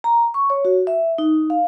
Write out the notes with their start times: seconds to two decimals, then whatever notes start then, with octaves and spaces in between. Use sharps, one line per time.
0.04 A#5
0.34 C#6
0.50 C#5
0.65 F#4
0.87 E5
1.18 D#4
1.50 F5